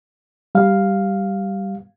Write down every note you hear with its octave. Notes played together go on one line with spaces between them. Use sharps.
G3 F5